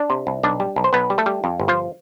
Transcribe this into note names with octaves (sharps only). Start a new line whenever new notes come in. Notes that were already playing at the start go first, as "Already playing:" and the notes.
Already playing: D4 D5
C3
C2
B1 D4 D5
G3
B1
C5
B1 B3 B4
G3
A3 A4
G3
F2
G1
F3 F4